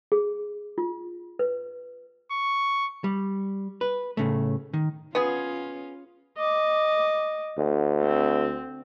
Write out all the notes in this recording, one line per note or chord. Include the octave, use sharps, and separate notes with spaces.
G#4
F4
B4
C#6
G3
B4
A2 C#3 A3
D#3
B3 C#4 F4 G#4
D#5 D6
D2
C4